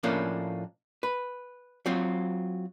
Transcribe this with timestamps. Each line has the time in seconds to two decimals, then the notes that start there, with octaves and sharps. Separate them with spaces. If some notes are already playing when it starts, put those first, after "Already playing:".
0.03 A2 F3 A3 A#3 C#4 D4
1.03 B4
1.86 F#3 C4 F4